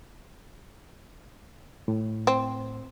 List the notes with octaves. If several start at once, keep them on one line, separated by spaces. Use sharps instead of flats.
A2
C4